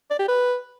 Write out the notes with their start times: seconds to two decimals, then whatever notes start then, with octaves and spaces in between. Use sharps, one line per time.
0.10 D5
0.19 G4
0.28 B4